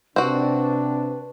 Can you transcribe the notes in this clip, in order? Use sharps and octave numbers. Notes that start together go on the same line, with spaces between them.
C3 C4 D4 F#4 B4